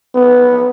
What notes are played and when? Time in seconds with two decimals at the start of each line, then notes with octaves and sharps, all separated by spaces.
0.15 B3